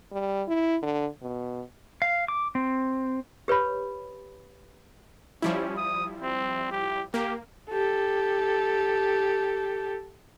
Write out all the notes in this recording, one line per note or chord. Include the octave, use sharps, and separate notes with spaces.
G3
E4
D3
B2
F5
D6
C4
G4 B4 C#5 B5
F3 G3 C#4 E4
D#6
C4
G4
A#3 G4
G4 A4